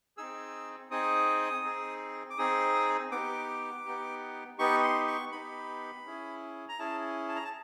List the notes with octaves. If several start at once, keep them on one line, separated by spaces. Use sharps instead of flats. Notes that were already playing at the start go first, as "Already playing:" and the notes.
C4 D#4 G#4 E6
C4 D#4 G#4 D#6
C4 D#4 G#4
D6
C4 D#4 G#4 D#6
B3 D#4 G4 D6
B3 D#4 G4
B3 D#4 G4 C#6
C6
C#6
B3 D#4 G4 B5
C#4 E4 G#4
A#5
C#4 E4 G#4 A5
A5
A#5
A5